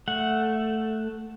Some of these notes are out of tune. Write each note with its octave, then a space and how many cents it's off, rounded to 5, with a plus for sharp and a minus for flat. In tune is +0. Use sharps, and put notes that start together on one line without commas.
A3 +0 F#5 -5